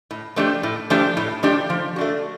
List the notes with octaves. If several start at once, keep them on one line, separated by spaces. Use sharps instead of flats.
A2
F3 A3 D4 G4
A2
F3 A3 D4 G4
A2
F3 A3 D4 G4
F3
A3 D4 F#4